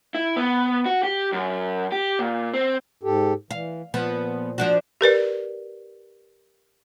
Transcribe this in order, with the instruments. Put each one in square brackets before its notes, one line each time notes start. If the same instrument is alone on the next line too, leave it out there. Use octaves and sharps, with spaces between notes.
[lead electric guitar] E4
B3
F#4
G4
F#2
G4
A#2
C4
[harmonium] G#2 G4 A4
[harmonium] E3 [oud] F5
[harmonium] A#2 [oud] F3 B3
[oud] F3 D4 F#4
[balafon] G4 A#4 B4 D5